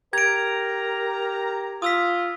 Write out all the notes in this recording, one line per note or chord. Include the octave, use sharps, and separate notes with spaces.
G4 A#4 A#5 G#6 D7
F4 D#6 E6 B6